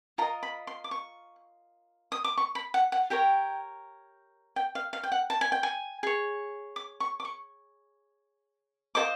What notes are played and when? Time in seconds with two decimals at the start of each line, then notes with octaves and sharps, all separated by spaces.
0.18 F4 A#4 D#5 A#5
0.43 B5
0.67 C6
0.84 D6
0.91 C#6
2.12 D#6
2.24 D6
2.37 C#6
2.55 B5
2.74 F#5
2.92 F#5
3.10 G4 A#4 C#5 G5
4.56 G5
4.75 F5
4.93 F5
5.03 G5
5.12 F#5
5.30 A5
5.41 G#5
5.52 G5
5.63 G#5
6.03 G#4 C#5
6.76 D6
7.00 C#6
7.20 D6
7.25 C#6
8.95 F4 A4 C5 D#5 D6